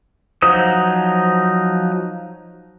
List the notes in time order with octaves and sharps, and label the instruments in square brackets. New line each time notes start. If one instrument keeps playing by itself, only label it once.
[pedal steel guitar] F3 F#3 D#4 C5 D#6